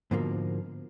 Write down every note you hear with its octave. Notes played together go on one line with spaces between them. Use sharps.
G#2 B2 D3 F3 A#3